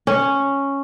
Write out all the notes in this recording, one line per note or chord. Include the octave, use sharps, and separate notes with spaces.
C#4